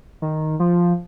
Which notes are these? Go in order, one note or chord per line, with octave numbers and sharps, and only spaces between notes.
D#3
F3